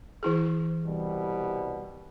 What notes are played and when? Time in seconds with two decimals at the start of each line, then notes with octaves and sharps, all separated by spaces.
0.23 E3 E4 G#4
0.86 C2 B2 G3